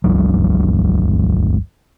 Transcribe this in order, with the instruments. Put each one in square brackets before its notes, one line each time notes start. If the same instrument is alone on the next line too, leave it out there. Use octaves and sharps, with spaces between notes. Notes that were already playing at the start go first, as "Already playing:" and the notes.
[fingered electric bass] G1 C#2 F#3